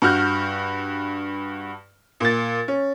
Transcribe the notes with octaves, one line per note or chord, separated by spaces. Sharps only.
G2 F#4 F6 G6
A#2 A6
C#4